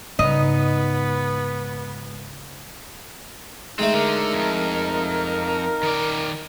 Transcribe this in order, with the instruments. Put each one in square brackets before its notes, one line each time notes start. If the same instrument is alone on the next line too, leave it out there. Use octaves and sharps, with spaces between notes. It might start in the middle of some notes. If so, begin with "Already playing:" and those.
[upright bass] G#2 [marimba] C#3 [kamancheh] B3 [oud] D#4
[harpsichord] G#3 A3 [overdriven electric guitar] C4 [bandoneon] D#4
[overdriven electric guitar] D3 [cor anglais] A#4
[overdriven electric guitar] F2
D#3 D5